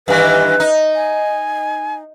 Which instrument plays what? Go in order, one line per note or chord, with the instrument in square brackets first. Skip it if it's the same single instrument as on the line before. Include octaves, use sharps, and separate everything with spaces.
[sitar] G2 D#3 E3 [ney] B4
[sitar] D#4
[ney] G#5